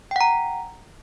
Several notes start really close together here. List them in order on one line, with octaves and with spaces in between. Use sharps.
G5 F#5 A#5